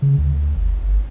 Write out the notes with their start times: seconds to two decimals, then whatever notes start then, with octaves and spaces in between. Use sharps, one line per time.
0.02 C#3
0.18 D2
0.56 F#1
0.82 G1